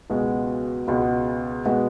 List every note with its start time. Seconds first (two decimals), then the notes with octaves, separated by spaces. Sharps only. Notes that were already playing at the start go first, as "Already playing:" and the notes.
0.10 C#2 B2 G#3 B3 F#4
0.87 C#2 B2 G#3 B3 F#4
1.65 B2 G#3 B3 F#4